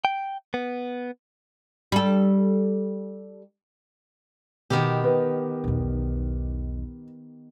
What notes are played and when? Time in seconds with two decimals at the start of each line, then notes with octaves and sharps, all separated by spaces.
0.05 G5
0.54 B3
1.92 G3 A4
4.70 B2 D#3 B3 G4
5.04 B4
5.64 B1 E2